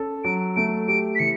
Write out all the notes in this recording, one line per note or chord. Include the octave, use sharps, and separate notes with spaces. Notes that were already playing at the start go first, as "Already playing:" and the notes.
Already playing: C#4 A4
F#3 D7
A3 D7
G4 D7
B6
E3 C#7